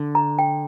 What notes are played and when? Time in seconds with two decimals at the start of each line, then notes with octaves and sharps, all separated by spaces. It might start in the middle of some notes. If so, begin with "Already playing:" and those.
Already playing: D3
0.15 A#5
0.39 G5